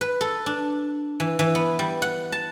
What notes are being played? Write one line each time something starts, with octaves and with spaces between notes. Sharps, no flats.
B4
A4
D4
E3
E3
B3
G3
F#5
A5